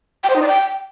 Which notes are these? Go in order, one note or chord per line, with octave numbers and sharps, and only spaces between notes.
G5
C5
D#4
D5
G5